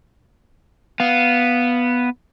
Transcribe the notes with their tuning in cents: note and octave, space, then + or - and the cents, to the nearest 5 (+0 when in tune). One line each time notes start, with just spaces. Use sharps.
B3 +0 F5 +0